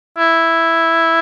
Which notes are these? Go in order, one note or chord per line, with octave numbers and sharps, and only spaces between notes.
E4